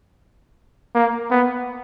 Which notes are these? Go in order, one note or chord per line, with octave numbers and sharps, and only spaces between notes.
A#3
B3